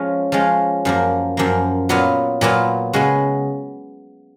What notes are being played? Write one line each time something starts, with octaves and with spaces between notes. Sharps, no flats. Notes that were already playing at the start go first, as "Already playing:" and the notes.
Already playing: F3 G#3 C#4 F4
F3 G#3 C#4 F4
F#2 F3 A#3
F#2 F3 A#3
A#2 F#3 B3 F4
A#2 F#3 B3 F4
C#3 G#3 B3 F#4